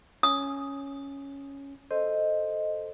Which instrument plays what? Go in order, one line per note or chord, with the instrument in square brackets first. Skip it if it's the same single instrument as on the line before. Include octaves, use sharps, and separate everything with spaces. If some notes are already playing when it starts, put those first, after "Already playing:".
[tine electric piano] C#4 [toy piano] D#6
[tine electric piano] A4 C5 [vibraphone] D#5